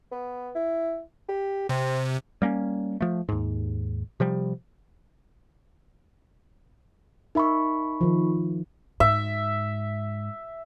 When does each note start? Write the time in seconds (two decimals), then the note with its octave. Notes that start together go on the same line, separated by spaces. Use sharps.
0.12 B3
0.55 E4
1.29 G4
1.69 C3 C4
2.42 G3 A#3 C4 C#4
3.01 F3 A3
3.29 D#2 G#2
4.20 C3 F3 G3
7.35 D#4 A#4 E5 B5 C#6
8.01 D#3 F3
9.00 G#2 E5